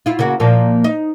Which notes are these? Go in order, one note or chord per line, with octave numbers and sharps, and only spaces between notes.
E4 F4
C#3 A#3 F#4
A#2 F3 A#3
D#4